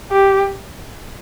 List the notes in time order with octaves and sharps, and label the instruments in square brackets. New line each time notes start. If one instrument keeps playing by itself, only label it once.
[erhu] G4